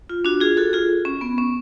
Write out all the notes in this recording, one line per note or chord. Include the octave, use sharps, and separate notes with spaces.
F4
D4 F#4
F4 G#4
F#4 A4
F4 G#4
C#4
B3
C#4